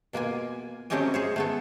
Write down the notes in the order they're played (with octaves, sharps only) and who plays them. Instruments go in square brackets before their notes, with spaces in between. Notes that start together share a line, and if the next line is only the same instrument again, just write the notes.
[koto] B2 A#3 F4 G#5
F#3 A3 C4 C#4 G4 D#5
G#4 C5 C#5
A3 B3 A4